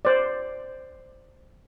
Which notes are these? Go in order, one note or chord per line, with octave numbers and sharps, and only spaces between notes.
C5 D5